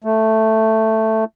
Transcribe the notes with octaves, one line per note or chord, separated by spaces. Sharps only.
A3